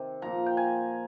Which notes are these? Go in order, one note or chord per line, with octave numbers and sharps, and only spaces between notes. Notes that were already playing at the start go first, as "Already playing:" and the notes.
Already playing: C3 D#3
A#2 F3 A#5
G5
G#5